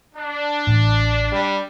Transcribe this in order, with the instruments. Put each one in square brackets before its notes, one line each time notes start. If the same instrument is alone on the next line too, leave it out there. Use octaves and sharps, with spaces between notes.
[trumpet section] D4
[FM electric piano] A1
[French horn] G3